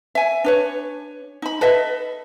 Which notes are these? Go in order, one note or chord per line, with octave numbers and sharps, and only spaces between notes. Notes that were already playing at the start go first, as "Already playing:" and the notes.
E5 G#5
D4 B4 C#5
D#4 B5
A4 B4 D#5 E5